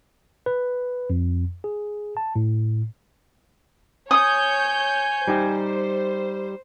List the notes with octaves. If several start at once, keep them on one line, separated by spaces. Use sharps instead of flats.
B4
F2
G#4
A5
A2
C#5 G#5 D#6 G6
G3 D#4 G4 C5